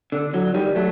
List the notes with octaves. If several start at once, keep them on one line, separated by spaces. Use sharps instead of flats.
D3
D3 F#3
D#3 G3
F#3 A3